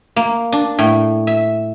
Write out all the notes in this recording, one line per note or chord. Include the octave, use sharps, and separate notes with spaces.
A#3
D4
A2
E5